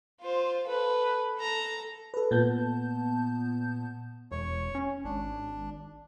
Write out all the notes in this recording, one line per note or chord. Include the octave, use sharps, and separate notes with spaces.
F4 C5
A4 B4
A4 A#5
A4 B4
A#2 B3 A5 G6
E1 C#5
C#4
G#1 D4